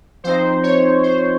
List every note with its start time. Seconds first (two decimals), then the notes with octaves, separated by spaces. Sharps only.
0.24 F3 C4 D#4 C5
0.63 C#5
1.03 C5